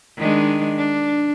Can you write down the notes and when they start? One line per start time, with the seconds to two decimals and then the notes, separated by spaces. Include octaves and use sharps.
0.18 D#3 G#3 D4
0.78 D4